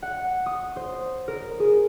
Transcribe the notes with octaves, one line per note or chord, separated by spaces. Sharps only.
F#5
D#6
C5
A#4
G#4